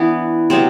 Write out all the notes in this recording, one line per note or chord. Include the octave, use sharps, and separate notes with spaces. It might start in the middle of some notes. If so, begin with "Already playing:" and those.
Already playing: E3 B3 D4
C3 F#3 B3 C4